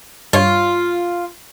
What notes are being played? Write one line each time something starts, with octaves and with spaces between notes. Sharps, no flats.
G2 F4 C#5